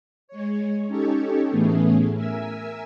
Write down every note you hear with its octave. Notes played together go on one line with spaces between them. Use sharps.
G#3 C#5
C#4 D#4 G4 A4 C#5
A2 E3 A3 B3 C#4 G#4
A#4 E5 G#5 E6